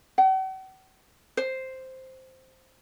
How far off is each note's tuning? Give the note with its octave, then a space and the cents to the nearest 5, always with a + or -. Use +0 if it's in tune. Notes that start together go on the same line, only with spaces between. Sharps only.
F#5 +45
C5 +0